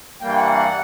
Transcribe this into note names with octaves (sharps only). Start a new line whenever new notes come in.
G2 E3 G3 A#3 G5
F#5
F#5
F#5